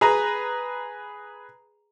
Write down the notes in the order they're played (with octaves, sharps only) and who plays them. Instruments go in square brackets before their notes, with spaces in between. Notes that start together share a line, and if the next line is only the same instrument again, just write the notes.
[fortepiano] G#4 B4 A#5